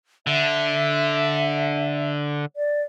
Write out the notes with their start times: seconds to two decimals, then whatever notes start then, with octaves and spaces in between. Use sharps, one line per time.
0.27 D3 E5
2.56 D5